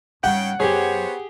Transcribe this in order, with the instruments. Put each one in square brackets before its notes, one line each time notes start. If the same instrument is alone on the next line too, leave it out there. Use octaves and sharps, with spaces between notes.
[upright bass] G#2 G3 [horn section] C#3 G5 [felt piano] F#5
[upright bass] F#2 F#3 [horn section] B3 C5 C#5 [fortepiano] G4 G#4